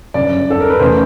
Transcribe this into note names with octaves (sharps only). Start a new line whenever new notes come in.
G1 F#2 C#3 D5
A4
A#4
B4
E2 C#3 E3 A3 C5